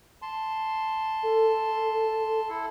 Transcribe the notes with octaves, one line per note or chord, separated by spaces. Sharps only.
A5 C6
A4
E4 A4